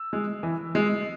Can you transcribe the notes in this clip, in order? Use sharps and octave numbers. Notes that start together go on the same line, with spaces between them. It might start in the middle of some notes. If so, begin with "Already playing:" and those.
Already playing: E6
G#3
E3
G#3